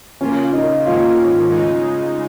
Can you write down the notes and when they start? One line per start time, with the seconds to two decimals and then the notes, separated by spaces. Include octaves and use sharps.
0.20 C#3 A#3 C#4 F4
0.53 D#4
0.85 G#2 D#3 A#3 C#4 F4
1.49 C#3 G#3 D#4